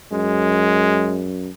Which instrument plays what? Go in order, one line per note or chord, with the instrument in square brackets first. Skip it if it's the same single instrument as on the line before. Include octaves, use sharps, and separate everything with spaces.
[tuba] F#2 [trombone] G#3